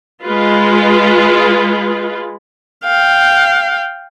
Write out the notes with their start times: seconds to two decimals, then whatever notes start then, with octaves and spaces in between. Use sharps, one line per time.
0.25 G#3 F4 B4
2.84 F5 G5